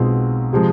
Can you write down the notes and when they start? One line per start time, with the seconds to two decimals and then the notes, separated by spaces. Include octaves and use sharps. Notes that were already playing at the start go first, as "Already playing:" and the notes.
Already playing: B1 B2 G#3 C4 F4
0.53 C3 F3 G#3